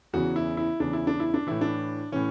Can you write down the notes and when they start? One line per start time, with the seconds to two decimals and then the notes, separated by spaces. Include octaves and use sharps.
0.13 E2 C#3 E3 F#4
0.36 E4
0.57 E4
0.80 E2 C#3 E3 D4
0.93 E4
1.07 D4
1.20 E4
1.34 D4
1.47 A2 E3 E4
1.61 D4
2.12 A2 E3 C#4